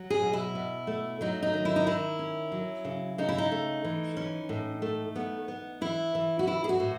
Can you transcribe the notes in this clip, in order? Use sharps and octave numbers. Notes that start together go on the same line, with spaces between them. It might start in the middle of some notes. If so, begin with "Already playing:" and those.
Already playing: F#3
G#4
B2
E4
B2
A3
F#3 D#4
D#4
D#3
E4
D#4
D#3 E4
C#4
F#3
C#3
C#3 D#4
E4
D#4
A3
E3
C#4
A2
A3
B3
B3
E3 E4
E3
F#4
E3 E4
G#4
F#4
A2